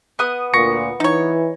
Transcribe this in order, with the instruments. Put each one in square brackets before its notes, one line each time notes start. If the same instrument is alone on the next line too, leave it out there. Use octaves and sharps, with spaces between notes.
[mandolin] B3 D#6
[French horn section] D2 A#2 [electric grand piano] C#6 A#6 C#7
[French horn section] E3 [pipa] D#4 C#5